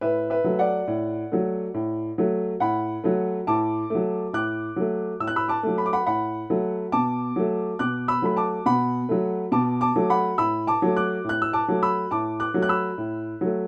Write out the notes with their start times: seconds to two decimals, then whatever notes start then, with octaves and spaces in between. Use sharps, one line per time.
0.01 A2 B4 E5
0.30 B4 E5
0.44 F#3 A3
0.59 D5 F#5
0.87 A2
1.32 F#3 A3
1.74 A2
2.18 F#3 A3
2.60 A2 F#5 B5
3.04 F#3 A3
3.47 A2 A5 D6
3.90 F#3 A3
4.33 A2 D6 F#6
4.76 F#3 A3
5.20 A2 E6
5.27 F#6
5.36 B5 E6
5.48 A5 D6
5.63 F#3 A3
5.78 B5
5.86 D6
5.93 F#5 B5
6.06 A2 F#5 B5
6.50 F#3 A3
6.92 B2 A5 D6
7.36 F#3 A3
7.79 B2 D6 F#6
8.08 B5 E6
8.22 F#3 A3 B5
8.36 A5 D6
8.66 B2 F#5 B5
9.09 F#3 A3
9.52 B2 A5 D6
9.81 A5 D6
9.96 F#3 A3
10.10 F#5 B5
10.38 A2 B5 E6
10.67 A5 D6
10.82 F#3 A3
10.96 D6 F#6
11.24 A2 F#6
11.42 E6
11.53 A5 D6
11.68 F#3 A3
11.83 B5 E6
12.11 A2 A5 D6
12.40 D6 F#6
12.54 F#3 A3
12.62 F#6
12.69 B5 E6
12.98 A2
13.41 F#3 A3